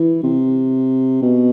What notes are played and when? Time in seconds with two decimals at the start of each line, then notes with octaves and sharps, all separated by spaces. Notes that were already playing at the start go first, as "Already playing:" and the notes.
Already playing: E3
0.23 C3
1.22 B2